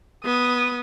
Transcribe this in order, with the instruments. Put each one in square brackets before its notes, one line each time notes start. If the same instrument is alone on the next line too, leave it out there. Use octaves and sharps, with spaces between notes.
[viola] B3 [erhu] D#6